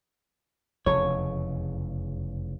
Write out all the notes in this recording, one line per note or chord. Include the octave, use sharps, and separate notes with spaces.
F1 E2 C#3 C#5